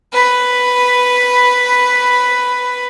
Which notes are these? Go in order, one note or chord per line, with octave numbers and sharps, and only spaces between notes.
B4 B5